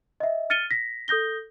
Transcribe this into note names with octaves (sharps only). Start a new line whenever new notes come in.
D#5 E5
F6 A6 C#7 D#7 G7
A#6 B6
A4 D#6 G6 A#6 G7